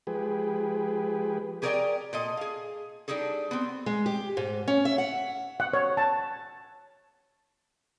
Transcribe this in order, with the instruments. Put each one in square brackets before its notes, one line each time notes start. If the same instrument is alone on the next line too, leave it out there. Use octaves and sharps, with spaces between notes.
[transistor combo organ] F3 G#3 G4 G#4 B4
[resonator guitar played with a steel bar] G4 G#4 A#4 C#5 D5 G5
A#2 A4 D#5
G#4 F5
G3 D4 D#4 G#4 A4
B3 C4
[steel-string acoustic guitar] G#3
G4
G#2
C#4
E5
F#5
[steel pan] F#5
C#5
A5